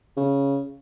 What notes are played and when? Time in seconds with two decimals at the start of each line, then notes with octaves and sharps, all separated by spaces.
0.17 C#3